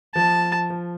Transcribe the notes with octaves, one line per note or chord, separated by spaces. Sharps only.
F3 A5
F3